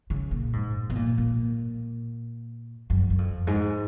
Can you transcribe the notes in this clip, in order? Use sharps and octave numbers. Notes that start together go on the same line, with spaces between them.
C#3
A#2
G#2
B2
A#2
A#2
F#2
F#2
F2
G#2